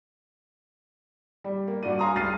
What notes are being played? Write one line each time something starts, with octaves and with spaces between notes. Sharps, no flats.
G3
A#3
G2 F#4 D5 D#7
F5 G#5 A#5 C6 D#6
C#2 G2 F6 A6 C7 D#7